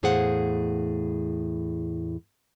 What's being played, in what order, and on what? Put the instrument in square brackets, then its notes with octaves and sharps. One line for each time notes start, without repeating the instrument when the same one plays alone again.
[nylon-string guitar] E2 A2 G#4 C5 F5 F#5